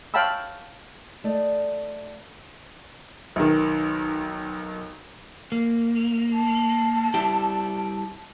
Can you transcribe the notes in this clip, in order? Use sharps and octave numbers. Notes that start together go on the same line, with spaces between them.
C#5 F5 G5 A5 B5 E6
A3 D5 D#5
B1 D#3
A#3
A5
G3 E4 G4